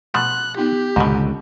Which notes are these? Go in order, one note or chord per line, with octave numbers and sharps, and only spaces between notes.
B2 F3 A3 F#5 F#6
B3 D#4 F4 G4
C#2 G#2 B2 D3